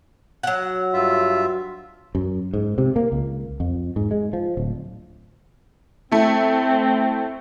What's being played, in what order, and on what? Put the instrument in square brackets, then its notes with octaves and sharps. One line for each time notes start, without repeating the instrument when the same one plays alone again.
[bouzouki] F#3 F#5
[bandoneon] G2 F4 E5
[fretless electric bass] F#2
G#2
C3
A#3
C#2
F2
G#2
G#3
F3
D1
[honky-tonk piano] A3 E4 [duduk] C4